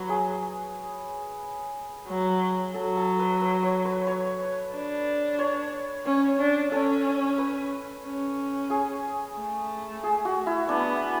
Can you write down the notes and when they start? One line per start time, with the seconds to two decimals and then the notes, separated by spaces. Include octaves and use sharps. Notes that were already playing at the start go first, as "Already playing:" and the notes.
Already playing: F#3 B4 C#5
0.09 G#4
2.07 F#3
2.74 F#3 A4
2.97 A4
3.19 B4
3.41 B4
3.63 C#5
3.85 B4
4.07 C#5
4.73 D4
5.39 C#5
6.05 C#4 C#5
6.39 D4
6.71 C#4 A4
7.38 B4
8.04 C#4
8.70 G#4
9.37 A3
10.04 G#4
10.25 F#4
10.47 E4
10.69 B3 D4